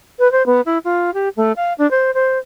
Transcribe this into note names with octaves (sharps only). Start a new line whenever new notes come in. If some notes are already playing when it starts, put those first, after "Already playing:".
B4
C5
B3
E4
F4
G4
A3
F5
D4
C5
C5